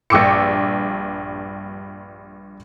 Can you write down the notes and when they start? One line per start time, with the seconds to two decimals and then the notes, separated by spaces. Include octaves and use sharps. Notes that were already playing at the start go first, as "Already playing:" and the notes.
0.10 A#1 G2 G5 D6 E6 C#7